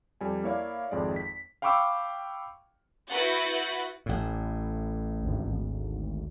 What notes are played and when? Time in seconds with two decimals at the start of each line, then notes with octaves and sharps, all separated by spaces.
0.21 F2 G3 G#5
0.44 A#3 E4 C#5 D5 F5
0.91 G#1 F2 G#3 D5
1.16 B6
1.62 F5 G5 B5 C#6 D6 E6
3.08 E4 F#4 B4 F#5 G6 A6
4.06 A1 A2
5.22 G#1 D2